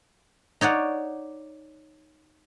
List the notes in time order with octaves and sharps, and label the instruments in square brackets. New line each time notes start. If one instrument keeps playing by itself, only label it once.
[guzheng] D#4 C#5 D5 F#5